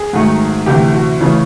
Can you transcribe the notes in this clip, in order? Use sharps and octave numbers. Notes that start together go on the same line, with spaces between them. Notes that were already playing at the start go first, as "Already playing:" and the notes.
Already playing: G#4
G#2 D#3 F#3 A3
D2 C3 E3 A3 G4
F#4
C#3 E3 A3 C#4 F4